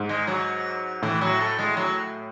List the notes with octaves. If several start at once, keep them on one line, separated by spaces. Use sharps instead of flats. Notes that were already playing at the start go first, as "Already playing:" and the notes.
Already playing: G#2
G#3
F#3
A2 E3
F#3
A3
G#3
F#3